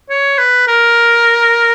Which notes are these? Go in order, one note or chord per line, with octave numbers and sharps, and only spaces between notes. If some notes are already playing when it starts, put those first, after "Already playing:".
C#5
B4
A#4